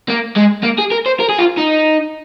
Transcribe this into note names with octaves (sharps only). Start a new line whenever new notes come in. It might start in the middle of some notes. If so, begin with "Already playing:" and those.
A#3
G#3
A#3
G#4
A#4
C5
A#4
G#4
F4
D#4